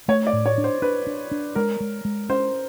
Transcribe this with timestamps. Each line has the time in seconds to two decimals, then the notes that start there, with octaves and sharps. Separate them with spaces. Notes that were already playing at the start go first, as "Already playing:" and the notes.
0.08 A3 C#5
0.27 D5
0.33 A2
0.46 C#5
0.58 D4
0.64 C5
0.82 D4 B4
1.07 D4
1.31 D4
1.55 G#3 A#4
1.80 G#3
2.05 G#3
2.29 C#4 C5